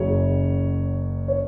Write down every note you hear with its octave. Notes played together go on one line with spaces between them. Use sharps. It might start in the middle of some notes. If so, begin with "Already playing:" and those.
Already playing: F#1 F#2 C#3 C#5
C#5